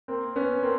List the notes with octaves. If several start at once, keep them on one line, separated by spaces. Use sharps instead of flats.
A#3 C4
B3 C#4
A#3 C4